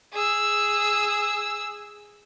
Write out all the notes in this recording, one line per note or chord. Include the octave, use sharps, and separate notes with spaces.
G#4 E6